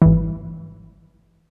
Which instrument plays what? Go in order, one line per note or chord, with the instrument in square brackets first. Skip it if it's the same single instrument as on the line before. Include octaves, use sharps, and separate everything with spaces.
[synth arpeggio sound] G#1 E3